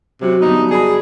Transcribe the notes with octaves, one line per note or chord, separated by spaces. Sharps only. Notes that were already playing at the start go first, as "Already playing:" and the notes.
C3 F#3 C#4 F#4
G2 D3 B3 D#4
G#4 D5 B5